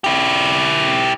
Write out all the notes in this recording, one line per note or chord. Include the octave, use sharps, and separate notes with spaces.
E4 G4